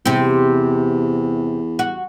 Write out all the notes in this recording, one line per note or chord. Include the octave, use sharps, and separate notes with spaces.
E2 C3 C4
F#4